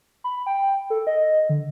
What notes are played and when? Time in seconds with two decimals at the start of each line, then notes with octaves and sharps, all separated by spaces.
0.24 B5
0.46 G5
0.90 A4
1.07 D#5
1.49 D3